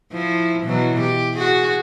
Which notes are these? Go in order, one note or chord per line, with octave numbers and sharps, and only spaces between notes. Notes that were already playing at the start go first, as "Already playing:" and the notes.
F3 E4
B2 E3 F#3
G4
F#4 G#4